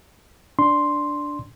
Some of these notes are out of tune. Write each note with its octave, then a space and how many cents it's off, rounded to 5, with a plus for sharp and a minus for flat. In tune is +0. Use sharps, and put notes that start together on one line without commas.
D4 +0 C6 +0